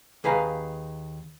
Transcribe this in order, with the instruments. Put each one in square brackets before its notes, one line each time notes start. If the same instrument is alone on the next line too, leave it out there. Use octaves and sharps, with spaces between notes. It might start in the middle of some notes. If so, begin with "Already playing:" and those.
[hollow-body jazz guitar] D#2 G#4 B4 F5 A#5